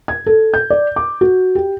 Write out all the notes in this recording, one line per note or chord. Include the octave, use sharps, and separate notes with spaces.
G#6
A4
G6
D5
D6
F#4
G4